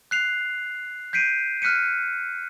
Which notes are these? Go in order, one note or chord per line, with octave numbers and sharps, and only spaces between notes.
F#6 C7 F7
G6 B6 C7 D7 D#7
F6 F#6 B6 C#7 D#7